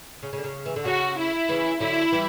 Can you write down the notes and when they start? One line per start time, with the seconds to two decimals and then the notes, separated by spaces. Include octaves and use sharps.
0.23 C#3
0.33 C#3
0.38 D3
0.44 C#3
0.66 E3
0.76 D3
0.85 C#3 F#4
1.18 E4
1.49 C#3 E3
1.80 D3 F#3 E4
2.12 E3 G3